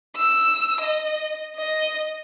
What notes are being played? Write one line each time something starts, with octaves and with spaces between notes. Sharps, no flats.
E6
D#5
D#5